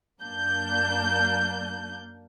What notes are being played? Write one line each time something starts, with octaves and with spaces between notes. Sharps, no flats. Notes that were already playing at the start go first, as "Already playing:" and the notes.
F#2 A#3 D4 G6